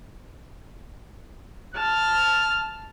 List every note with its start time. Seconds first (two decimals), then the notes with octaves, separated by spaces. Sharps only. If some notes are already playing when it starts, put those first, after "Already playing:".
1.75 A5 F6